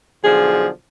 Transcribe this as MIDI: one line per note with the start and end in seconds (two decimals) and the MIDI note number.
0.24 0.69 35
0.24 0.69 50
0.24 0.69 53
0.24 0.67 68